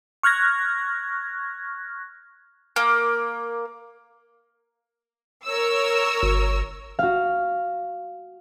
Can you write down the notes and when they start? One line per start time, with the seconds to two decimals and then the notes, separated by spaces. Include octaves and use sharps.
0.23 C#6 F6 F#6 G#6 A#6
2.76 A#3
5.45 A#4 C#5 E6
6.23 G1
6.99 F#4 F5